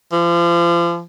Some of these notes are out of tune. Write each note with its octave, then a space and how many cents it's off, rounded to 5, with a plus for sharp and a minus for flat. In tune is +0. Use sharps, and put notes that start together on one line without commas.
F3 -35